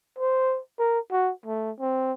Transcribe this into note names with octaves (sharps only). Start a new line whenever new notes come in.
C5
A#4
F#4
A3
C4